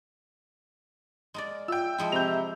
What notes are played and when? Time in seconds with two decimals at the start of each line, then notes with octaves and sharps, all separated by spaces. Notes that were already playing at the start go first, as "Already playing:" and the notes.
1.34 G#3 A#4 D5
1.68 F4 E5 G5 E6
1.98 F3 G#3 E4
2.12 C3 A#5 B5 E6 G6 F7